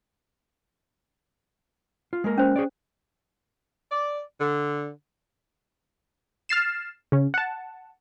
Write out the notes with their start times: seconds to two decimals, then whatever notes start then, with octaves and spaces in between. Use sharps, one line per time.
2.13 F4
2.24 G#3 A#3 A#4
2.38 C#4 C5
2.56 G#4 C#5 D5
3.92 D5
4.41 D3
6.49 F6 A6 C7 E7
7.12 C#3 C#4
7.34 F#5 A5